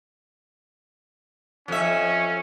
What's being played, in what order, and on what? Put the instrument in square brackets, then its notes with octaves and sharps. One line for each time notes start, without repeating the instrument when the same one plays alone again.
[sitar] F2 E5 [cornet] C#4